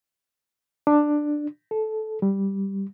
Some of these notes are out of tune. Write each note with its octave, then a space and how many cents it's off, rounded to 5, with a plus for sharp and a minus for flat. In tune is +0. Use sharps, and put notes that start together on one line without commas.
D4 +10
A4 -15
G3 +0